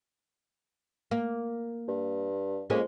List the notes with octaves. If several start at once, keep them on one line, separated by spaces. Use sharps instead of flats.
A#3
G2
F2 G#3 A#3 C#4